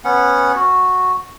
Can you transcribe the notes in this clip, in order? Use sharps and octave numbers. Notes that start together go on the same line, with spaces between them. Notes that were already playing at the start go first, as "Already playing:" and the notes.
B3 C#4 F#5
F#4